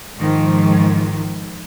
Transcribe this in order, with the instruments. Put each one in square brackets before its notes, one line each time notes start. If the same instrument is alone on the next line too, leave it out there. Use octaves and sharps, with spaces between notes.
[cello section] G#2 D#3 F3